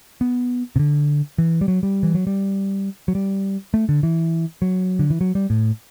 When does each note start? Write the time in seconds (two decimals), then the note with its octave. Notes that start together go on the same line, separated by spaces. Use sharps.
0.21 B3
0.76 C3
0.79 D3
1.38 E3
1.61 G3
1.68 F#3
1.83 G3
2.03 E3
2.15 F#3
2.27 G3
3.08 F#3
3.15 G3
3.74 A3
3.89 D3
4.03 E3
4.62 F#3
4.99 D3
5.10 E3
5.21 F#3
5.35 G3
5.50 A2